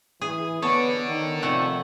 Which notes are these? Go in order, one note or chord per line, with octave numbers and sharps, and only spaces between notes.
E3 G#4
B3 A4 C#5 D5
D#3
F2 C3 A3 F#5